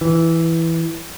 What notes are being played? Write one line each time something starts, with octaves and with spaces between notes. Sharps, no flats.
E3